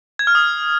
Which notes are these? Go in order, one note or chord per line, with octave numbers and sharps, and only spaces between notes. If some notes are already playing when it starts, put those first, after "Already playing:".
G#6
F6
D#6